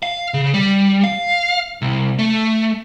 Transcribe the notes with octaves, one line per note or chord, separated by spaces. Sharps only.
F5
C#3
G3
F5
C2
A3